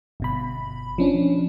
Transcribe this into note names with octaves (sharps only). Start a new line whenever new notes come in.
G1 B2 B5
F3 C#4 D4